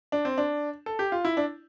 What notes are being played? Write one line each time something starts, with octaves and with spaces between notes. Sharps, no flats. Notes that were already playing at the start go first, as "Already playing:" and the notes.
D4
C4
D4
A4
G4
F4
E4
D4